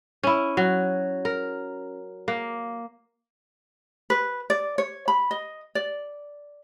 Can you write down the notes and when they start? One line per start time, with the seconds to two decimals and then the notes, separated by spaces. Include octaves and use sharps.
0.23 C#4 E4
0.57 F#3
1.25 A#4
2.28 A#3
4.10 B4
4.50 D5
4.78 C#5
5.08 B5
5.31 D#5
5.75 D5